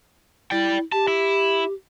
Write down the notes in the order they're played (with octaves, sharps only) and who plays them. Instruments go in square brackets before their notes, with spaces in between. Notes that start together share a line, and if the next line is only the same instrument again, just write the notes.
[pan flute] E4 [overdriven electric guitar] D5 G5
[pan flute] G4 [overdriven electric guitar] A5
[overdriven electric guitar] E4